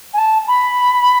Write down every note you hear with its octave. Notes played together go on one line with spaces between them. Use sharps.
G#5
A5
B5